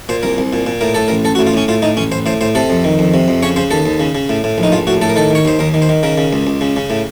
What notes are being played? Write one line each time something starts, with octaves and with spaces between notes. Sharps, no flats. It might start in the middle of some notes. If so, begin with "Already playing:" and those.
A#2 C5
C2 A#4
C2
A#2
A#2
A2 A#4
A2 A4
A1 A#4
A1 A4
F#4
A2
F4
A2 C#4
A2 F4
A2 D#4
A1 C#4
A1 C5
A2 C5
A2 C5
C3 A4
F2
D#3
F2
C3
F2
C#3 C#5
C#3 C5
D#2 A4
D#2
C#3
C#3
A2
A2
A#1
D#4
A#1 F4
A2 F#4
A2 A4
A#4
D#3 A4
D#3 C#5
D#2 C5
D#2 A#4
D#3
C5
D#3
C#3 A#4
C#3
C#2
C#2
C#3
C#3
A2